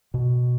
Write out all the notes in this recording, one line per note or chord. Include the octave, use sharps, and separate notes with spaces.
B2